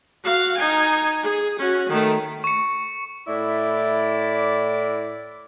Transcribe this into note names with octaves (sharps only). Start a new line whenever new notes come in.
F#4 F5
D#4 G#5
G#4
C#4 F#4
D#3 A3
C#6 C#7
A2 E4 D5